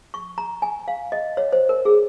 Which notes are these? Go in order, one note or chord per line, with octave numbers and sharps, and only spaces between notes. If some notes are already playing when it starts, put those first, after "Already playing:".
C#6
A#5
G#5
F5
D#5
C#5
C5
A#4
G#4